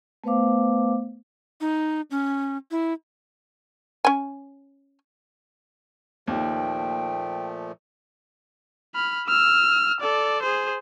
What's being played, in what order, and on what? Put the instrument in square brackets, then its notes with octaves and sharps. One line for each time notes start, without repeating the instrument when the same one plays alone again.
[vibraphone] A3 B3 B4 C5 F5 D6
[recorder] D#4
C#4
E4
[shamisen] C#4 G#5
[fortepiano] D#2 [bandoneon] A#2 F3 A3 [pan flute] G5
[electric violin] B5 F6
E6 F6
A4 D5
G#4 C5